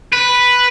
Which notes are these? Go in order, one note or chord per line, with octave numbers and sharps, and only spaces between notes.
B4